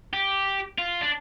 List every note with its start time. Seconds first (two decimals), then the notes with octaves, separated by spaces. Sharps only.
0.13 G4
0.78 F4
1.01 D4